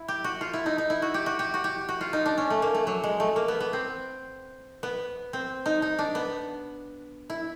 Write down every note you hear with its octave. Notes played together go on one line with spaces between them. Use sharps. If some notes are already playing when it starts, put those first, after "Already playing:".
Already playing: E4
G4
F#4
F4
E4
D#4
D#4
E4
F#4
G4
F#4
G4
F#4
G4
F#4
F4
D#4
D4
C#4
A3
A#3
A3
F#3
G#3
A3
A#3
B3
B3
C4
B3
C4
D#4
D#4
D4
B3
E4